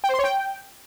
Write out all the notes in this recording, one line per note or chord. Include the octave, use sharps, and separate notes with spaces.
G5
C5
C6
C#5
G5